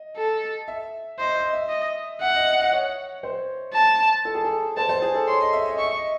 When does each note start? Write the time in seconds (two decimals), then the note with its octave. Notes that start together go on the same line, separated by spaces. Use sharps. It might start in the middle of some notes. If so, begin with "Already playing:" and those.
Already playing: D#5
0.17 A4
0.68 E5
1.19 C5 D#5
1.36 D#5
1.53 E5
1.70 D#5
2.21 E5 F#5
2.34 D#5
2.60 D#5
2.73 C#5
3.23 C5
3.74 A5
4.25 A4
4.35 G#4
4.44 A4
4.77 C5 A5
4.89 C5
5.02 G#4
5.15 A4
5.27 C#5 C6
5.40 D#5
5.53 E5
5.65 D#5
5.78 E5 C#6
5.96 D#5